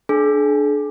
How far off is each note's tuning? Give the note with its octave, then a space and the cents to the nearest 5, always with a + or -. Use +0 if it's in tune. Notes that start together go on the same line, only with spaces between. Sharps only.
D4 +10 G#4 +45